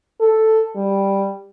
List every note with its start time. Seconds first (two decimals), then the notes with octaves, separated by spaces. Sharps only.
0.21 A4
0.76 G3